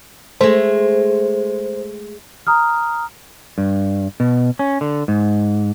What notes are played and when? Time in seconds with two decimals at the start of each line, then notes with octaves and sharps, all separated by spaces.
0.41 G#3 A3 C5
2.47 A#5 D#6 F6
3.58 G2
4.20 B2
4.59 C#4
4.81 D3
5.08 G#2